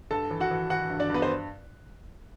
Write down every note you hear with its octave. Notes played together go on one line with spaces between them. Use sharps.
G2 A4 A5
E3
F#4 F#5
E3
E3 F#4 F#5
G2
D4 D5
G2 B3 B4
C5